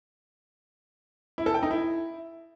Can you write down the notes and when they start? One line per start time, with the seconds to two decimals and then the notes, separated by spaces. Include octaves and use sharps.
1.38 E4
1.46 A4
1.54 G5
1.63 D#4
1.71 E4